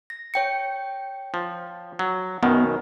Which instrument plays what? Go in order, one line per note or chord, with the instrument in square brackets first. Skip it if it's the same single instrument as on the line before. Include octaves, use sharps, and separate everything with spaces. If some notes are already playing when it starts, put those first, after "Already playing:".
[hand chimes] A#6
C#5 G5 C#7
[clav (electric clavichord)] F3
F#3
[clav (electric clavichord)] F#2 B2 D#3 [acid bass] B3